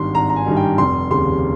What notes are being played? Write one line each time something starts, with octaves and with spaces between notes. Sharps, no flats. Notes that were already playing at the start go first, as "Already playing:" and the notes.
Already playing: G#1 G2 D#3 G3 C6
G#1 A#5
A#5
G#5
G2 D#3 G3
G5
F1 C6
D#2 C#3 G3 C6